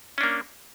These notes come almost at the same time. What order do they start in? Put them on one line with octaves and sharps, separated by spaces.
C#4 D4 A#3